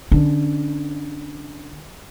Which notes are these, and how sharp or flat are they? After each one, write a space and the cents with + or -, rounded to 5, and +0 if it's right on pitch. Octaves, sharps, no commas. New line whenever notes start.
D3 +10 C#4 +0